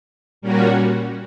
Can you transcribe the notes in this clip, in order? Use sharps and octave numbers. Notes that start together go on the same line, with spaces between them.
A#2 G3 A#3 C#4 F#4